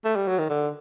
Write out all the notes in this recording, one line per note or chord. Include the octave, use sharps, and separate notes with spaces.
A3
G3
F#3
D#3
D3